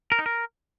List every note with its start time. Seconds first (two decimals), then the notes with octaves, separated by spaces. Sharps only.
0.12 A#4
0.19 D#4
0.26 A#4